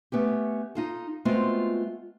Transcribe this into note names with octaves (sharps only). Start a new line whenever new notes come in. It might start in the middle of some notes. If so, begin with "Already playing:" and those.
A3 B3 C#4 G4
D#4 F4 A4
G#3 A3 B3 C4 F4 F#4